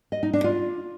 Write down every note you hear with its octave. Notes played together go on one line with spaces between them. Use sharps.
D#5
D#4
D4
F4